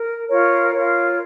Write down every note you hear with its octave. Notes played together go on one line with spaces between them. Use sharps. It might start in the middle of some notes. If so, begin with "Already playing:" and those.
Already playing: A#4
F4 A#4 C#5
F4 A#4 C#5